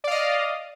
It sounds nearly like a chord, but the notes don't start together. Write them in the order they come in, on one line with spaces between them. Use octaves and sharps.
D5 F5 D#5